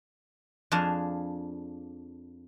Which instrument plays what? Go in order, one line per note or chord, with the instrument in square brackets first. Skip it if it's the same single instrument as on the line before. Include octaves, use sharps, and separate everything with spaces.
[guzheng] F2 D4 G#4 F5 A5